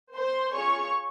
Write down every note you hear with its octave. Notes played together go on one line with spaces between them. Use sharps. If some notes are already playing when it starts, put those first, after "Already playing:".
C5 C6
C#4 F4 G#4 C#5 C#6